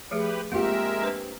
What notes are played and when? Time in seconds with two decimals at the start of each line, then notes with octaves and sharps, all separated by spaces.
0.11 F3 A3 G4 G#4 B4
0.52 G#3 A#3 C4 F4 G4 A#4 E5
1.02 D4 B4 C5